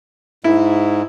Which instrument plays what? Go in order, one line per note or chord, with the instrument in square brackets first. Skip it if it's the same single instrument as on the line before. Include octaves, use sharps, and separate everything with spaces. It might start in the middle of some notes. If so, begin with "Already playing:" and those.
[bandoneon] G#2 [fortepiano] E4